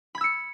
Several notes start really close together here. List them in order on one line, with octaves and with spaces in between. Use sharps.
B5 G#6 E6 C#7